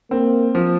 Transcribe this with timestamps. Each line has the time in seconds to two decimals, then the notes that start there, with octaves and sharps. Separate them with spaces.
0.11 A#3 C4
0.55 F3